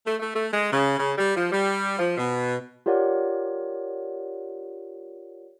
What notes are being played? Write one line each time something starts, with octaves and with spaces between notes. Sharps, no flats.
A3
A3
A3
G#3
C#3
C#3
G3
F3
G3
F3
B2
F4 G4 A#4 C#5 D5 F#5